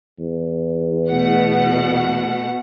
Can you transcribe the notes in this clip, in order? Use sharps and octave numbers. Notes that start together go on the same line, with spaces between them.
E2
B2 A3 F#5